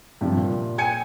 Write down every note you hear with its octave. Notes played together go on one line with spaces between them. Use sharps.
G2 C3 F3
A#2
G5 G#5 G#6 C#7 D#7